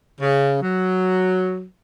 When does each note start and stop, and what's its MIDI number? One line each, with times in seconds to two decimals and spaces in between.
0.21 0.57 49
0.63 1.65 54